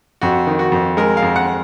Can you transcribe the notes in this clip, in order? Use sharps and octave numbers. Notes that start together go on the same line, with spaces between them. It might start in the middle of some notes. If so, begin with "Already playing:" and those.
F2 F#4
D#3
F#4
F2
G#3 A#4
F5
F2
F#5